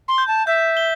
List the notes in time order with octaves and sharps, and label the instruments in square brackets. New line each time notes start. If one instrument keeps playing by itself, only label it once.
[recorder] C6
[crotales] G6
[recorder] A5
[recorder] E5 [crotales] G6
[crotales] G7